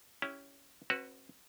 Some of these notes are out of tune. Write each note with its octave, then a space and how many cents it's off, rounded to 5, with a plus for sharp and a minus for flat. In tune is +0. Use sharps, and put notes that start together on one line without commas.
C#4 +10 E4 +0 G4 +0
C4 +45 F#4 +0 B4 +0